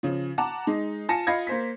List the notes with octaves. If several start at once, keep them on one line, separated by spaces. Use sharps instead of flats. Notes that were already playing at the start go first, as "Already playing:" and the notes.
C#3 F3
F#5 A5 A#5 D6
G#3 D#4
F4 G#5 A5 A#6 C#7
F4 D#5 F5 B5 G#6 A#6
A#3 C5 B6